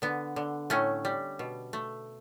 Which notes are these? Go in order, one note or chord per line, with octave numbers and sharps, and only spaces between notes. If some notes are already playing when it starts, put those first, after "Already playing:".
D3 B3
D3
A2 A3 C#4
G3
B2
A3